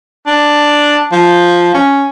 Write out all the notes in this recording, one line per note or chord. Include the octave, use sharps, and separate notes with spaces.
D4
F3
C#4